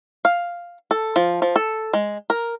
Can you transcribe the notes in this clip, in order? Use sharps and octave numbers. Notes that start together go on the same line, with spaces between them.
F5
A4
F3
F3
A4
G#3
A#4